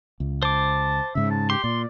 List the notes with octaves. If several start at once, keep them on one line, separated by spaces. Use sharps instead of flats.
C#2
C5 A5 D6
G#2 C#3 E5
A5
G4 C6
A#2 D5